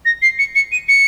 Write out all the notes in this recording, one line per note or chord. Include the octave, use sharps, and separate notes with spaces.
A#6
C7
C#7
C#7
D#7
C#7